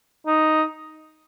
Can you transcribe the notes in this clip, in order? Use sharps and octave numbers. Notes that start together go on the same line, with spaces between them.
D#4